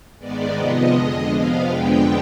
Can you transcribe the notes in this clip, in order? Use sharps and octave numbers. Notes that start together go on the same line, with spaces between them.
G#2 D#3 G#3 B3 D5
C3 F3 B3 D#5
F2 D3 G#3
C3 F3 B3 F5
F2 D3 G#3 B3 G5